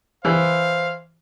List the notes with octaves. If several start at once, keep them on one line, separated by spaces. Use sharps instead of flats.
E3 C5 F5